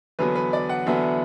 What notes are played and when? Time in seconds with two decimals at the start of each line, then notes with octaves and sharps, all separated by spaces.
0.19 E2 D3 F#3 B3 B4
0.35 B4
0.53 D5
0.69 F#5
0.86 E2 D3 F#3 B3 E5